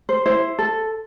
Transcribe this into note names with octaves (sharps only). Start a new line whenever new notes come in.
C5
E4 C5
A4